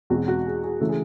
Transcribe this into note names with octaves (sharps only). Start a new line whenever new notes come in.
E2 B2 G#3 C4 F#4
F#4
G#4
G#4
C#3 E3 A3 A4
G#4